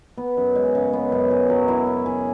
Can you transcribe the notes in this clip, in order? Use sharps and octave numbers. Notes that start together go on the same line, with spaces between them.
B3
F#2
G#3
C#3
B3
F#2
G#4
F#3
E4
C#4
G#4